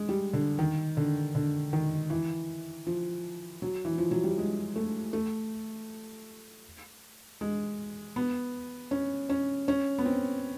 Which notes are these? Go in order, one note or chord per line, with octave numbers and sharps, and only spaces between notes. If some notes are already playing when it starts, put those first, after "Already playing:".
Already playing: G#3
G3
D3
D#3
D3
D3
D#3
E3
F3
F#3
E3
F3
F#3
G3
G#3
A3
A3
G#3
B3
C#4
C#4
C#4
B3
C4